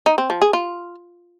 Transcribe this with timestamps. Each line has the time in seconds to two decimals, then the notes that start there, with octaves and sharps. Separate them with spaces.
0.06 D#4
0.18 C4
0.30 F3
0.42 G#4
0.53 F4